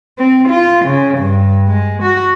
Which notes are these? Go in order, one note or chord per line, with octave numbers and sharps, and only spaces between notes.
C4
F4
C#3
G2
G#3
F#4